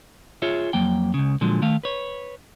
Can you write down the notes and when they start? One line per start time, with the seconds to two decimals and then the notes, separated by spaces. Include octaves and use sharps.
0.42 F4 G#4 C#5 E5
0.73 F2 F#3 A#3 G5
1.14 C#2 C#3
1.41 A#2 D3 F3 F#3 G#3
1.62 D#3 A3 F5
1.84 B4 C#5